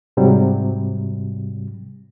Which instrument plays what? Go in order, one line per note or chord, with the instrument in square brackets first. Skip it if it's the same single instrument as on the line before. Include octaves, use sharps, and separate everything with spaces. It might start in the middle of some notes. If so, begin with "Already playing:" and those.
[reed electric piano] G#2 C3 F#3 G3